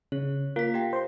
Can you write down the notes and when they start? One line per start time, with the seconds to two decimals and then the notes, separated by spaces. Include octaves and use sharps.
0.12 C#3 C#5
0.56 A#3 F4 B6
0.74 G4 F5 G5
0.93 C5 C6